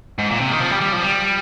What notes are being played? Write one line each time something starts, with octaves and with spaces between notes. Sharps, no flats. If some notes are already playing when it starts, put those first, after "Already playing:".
G#2
A#2
C3
D#3
F3
G3
G3
F3
G3